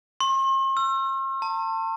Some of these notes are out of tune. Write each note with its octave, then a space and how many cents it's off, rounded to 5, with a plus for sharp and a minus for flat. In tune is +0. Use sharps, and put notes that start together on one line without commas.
C6 +45
E6 +35
A5 +40